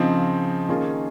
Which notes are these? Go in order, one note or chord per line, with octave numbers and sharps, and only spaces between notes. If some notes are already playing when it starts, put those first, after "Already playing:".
Already playing: C#3 F3 C4 D#4
D#3 A#3 C#4 F4 G#4